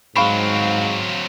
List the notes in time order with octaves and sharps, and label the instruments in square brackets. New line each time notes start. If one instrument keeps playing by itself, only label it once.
[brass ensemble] G#2 [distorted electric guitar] F#3 C4 [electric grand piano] F5 C#6 [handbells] B5